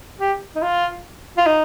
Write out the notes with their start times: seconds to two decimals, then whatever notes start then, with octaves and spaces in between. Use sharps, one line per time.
0.20 G4
0.55 D#4
0.62 F4
1.38 F4
1.46 D#4